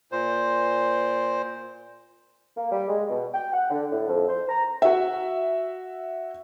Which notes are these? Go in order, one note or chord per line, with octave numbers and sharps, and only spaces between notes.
A#2 C5
A#3
G3
G#3
B2
G5
F#5
D3
A2
F2
C5
A#5
F#4 E5